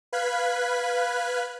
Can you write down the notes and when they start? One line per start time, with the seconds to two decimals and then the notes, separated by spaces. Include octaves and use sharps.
0.13 B4 F5 F#6 G#6 B6